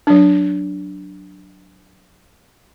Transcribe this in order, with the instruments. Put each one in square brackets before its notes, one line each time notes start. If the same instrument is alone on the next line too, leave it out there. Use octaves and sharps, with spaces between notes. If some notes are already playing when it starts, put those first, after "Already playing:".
[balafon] F#3 D4